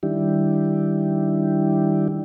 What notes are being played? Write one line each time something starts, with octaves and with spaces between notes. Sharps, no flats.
D#3 G3 D4 E4 G4